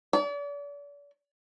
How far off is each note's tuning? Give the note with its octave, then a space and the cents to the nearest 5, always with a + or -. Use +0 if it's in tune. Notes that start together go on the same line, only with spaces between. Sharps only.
D5 -40